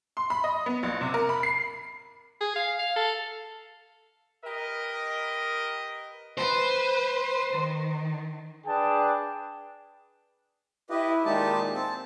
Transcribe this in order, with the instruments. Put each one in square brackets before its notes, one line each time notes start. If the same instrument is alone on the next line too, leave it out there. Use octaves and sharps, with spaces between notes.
[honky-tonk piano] C6
B5
D#5
B3
A#1
C3
A#4
B5
C7
[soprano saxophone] G#4
F5
F5
A4
[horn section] G4 A#4 B4 D#5
[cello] B4 [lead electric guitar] C5
[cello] D#3
[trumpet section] D4 G#4 B4 G5 A5
[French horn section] E4 [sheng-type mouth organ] G4 B4 D#5
[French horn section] A#2 D#3 G#3 [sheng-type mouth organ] D#4 G4 A5
[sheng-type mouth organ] C4 A5